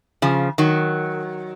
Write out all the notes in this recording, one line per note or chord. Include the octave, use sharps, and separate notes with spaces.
C#3 F3
D#3 F#3